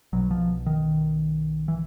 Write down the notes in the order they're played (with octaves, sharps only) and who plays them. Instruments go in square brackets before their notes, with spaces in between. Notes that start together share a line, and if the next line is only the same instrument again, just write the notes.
[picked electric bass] B1 B2 F#3
F3
D#3
E3